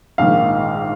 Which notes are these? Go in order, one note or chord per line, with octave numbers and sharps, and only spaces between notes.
A#1 G#2 D#3 F5